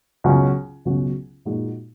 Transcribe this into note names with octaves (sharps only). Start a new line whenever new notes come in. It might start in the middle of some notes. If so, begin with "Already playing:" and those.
C#2 B2 F#3 C#4 F#4
C#2 B2 F#3 C#4 F#4
A#2 G#3 D#4 F#4